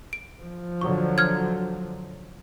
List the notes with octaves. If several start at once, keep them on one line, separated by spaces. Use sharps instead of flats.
D7
F3
D3 F#3 C#6
F6 G#6